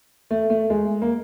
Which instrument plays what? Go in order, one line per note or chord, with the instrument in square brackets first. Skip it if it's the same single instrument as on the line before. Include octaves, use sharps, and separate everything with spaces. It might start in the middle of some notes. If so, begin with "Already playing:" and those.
[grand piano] A3
A3
G#3
A#3